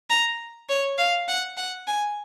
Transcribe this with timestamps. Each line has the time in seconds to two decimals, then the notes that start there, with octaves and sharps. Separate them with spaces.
0.10 A#5
0.69 C#5
0.98 F5
1.28 F#5
1.57 F#5
1.87 G#5